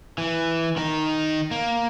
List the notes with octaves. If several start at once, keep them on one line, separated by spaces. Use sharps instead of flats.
E3
D#3 D#4
A#3